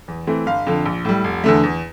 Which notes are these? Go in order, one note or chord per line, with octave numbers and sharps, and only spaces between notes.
E2
E3 A3 C4
G1 F5
F2 D3
A#1
A2 G3
F1
E2 D3 A3
E2